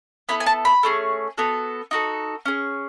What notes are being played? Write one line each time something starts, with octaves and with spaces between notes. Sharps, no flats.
B3 E4 A4 B5
G#5
A5
B5
A3 C#4 G#4
B3 F#4 A4
D#4 F#4 A4
C#4 G#4